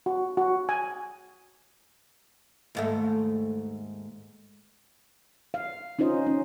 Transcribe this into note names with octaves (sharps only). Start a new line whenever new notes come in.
F#4
F#4
G#5
D#2 G#2 A3
F5
C#4 D#4 F4 C5 D#5
C#4